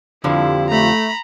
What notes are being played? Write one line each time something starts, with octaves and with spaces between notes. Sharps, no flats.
F2 D3 F3 E4 F4 G4 F5
A3 A#5 B5